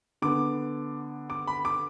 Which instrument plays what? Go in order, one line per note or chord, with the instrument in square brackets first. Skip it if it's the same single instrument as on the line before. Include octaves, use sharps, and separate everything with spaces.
[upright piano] D3 B3 D6
D6
B5
D6